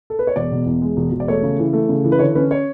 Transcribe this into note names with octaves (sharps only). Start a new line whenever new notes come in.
A4
B4
C#5
E1 D5
B2
E2
G#3
E1
E1
D5
A3 C#5
C#3
E3
A3
C#3
E3
B4
D3 C#5
C#4 B4
C#5